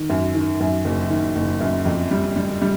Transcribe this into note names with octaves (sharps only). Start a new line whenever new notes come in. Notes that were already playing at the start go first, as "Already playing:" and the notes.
Already playing: D#3
F#2
D#3
F#2
F#1
D#3
F#1
F#2
F2
G3
G3
G3